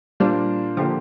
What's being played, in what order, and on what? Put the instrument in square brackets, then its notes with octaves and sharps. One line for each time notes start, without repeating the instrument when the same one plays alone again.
[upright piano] A#2 A#3 D4 F4 C5 [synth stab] G3
[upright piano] D3 A#3 G4 C5 [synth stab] F3